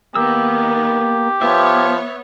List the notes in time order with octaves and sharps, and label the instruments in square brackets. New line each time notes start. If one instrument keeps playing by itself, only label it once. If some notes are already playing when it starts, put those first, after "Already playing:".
[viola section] D#3 B3 [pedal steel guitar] A#3 E6 [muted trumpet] G4
[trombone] F3 [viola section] B3 C#5 [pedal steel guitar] E5